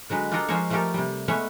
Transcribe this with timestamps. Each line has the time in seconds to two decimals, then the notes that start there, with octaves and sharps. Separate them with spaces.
0.10 D3 F#3 G#3 B4
0.31 D4 F4 G4 A4 A#4 D#5
0.48 F3 G#3 C#4 A#4 C5 C#5
0.70 F3 A3 C#4 G4 A4 A#4
0.94 C3 G3
1.28 G#3 A3 B3 C#4 C#5 E5